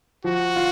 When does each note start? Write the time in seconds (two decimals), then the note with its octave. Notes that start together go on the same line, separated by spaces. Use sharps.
0.24 F3 F#4
0.56 F4